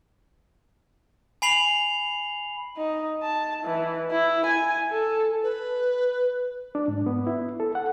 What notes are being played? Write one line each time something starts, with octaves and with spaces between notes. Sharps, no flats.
G#5 B5 C7 F7 F#7
D#4
A5
E3
E4
G#5
A4
B4
D4
G#2
B3
E4
A4
F#5